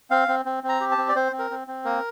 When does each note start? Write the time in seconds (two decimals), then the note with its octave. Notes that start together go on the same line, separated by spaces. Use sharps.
0.11 C4 F5
0.28 C4
0.45 C4
0.63 C4
0.69 A#5
0.80 G4
0.91 A5
0.98 C4
1.09 D5
1.15 C4 C5
1.32 C4
1.39 A#4
1.51 C4
1.67 C4
1.85 A#3 A#4